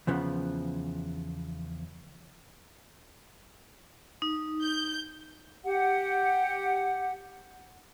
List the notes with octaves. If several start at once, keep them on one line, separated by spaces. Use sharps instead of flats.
E2 C#3 F3 B3
D#4
G6
G4 F#5